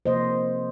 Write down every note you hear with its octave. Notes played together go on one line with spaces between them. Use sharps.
C3 F3 A#3 C5 D#5